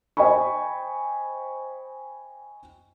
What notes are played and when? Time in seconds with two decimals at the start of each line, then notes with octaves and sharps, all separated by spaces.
0.17 C5 D#5 G5 G#5 B5 C#6